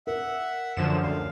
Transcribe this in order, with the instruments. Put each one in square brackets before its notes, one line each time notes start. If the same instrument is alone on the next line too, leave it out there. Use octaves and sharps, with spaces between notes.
[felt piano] A#4 [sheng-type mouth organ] E5 F#5
[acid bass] F#2 [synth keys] D3 F3 E7
[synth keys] D2 [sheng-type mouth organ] F5